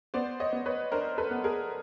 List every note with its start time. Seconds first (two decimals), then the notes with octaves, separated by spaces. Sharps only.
0.14 B3 C5 D5
0.40 C#5 D#5
0.53 B3
0.66 B4 C#5
0.92 D4 A#4 C5
1.18 A4 B4
1.31 B3
1.44 G#4 A#4